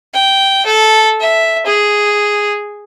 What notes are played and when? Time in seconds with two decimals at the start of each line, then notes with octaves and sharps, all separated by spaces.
0.14 G5
0.66 A4
1.21 E5
1.66 G#4